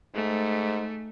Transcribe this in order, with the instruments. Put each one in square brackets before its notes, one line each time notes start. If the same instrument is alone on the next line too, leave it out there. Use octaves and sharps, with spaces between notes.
[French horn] G#2 [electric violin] A3